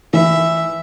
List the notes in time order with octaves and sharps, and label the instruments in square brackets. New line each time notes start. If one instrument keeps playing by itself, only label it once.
[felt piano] E3 [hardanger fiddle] E5